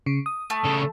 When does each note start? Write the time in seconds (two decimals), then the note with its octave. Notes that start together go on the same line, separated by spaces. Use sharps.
0.06 C#3
0.26 D#6
0.50 A3
0.65 C#3 A4